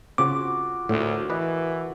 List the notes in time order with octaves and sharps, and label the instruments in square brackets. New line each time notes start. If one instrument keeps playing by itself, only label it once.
[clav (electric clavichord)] C#3 C4 [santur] F4 F#4 G#4 [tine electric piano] D6
[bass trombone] D2 [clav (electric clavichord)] A2 [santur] F#4 A#4
[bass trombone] E3 [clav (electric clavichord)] B4 D5 D#5